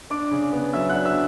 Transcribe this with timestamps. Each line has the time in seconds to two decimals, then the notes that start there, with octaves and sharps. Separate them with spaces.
0.10 D4 D5 D6
0.31 C#3
0.53 B3
0.73 F#3 E5 E6
0.89 F#5 F#6
0.95 D4
1.05 E5 E6